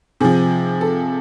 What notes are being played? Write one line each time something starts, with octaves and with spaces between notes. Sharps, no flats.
C3 F3 G#4
A4